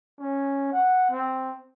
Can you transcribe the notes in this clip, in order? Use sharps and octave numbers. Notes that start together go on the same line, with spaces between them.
C#4
F#5
C4